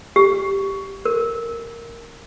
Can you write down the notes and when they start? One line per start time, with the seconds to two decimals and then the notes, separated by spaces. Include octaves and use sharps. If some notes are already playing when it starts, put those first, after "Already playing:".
0.16 G4
1.05 A#4